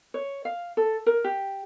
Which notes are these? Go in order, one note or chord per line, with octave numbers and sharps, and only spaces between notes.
C#5
F5
A4
A#4
G4